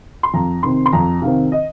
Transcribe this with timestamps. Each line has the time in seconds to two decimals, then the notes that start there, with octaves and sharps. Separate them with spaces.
0.23 C6
0.34 F2 A#5
0.63 C3 D#3 C4 C6
0.86 C6
0.93 F2 A#5
1.22 C3 D#3 C4 F5
1.52 D#5